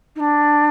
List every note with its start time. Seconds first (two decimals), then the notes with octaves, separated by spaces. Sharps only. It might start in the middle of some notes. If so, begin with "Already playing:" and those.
0.16 D#4
0.20 D4